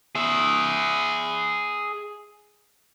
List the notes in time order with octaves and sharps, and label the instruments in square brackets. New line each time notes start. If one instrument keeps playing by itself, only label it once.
[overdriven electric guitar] G#4 E5